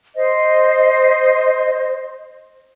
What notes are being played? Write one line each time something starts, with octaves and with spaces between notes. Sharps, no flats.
C5 D#5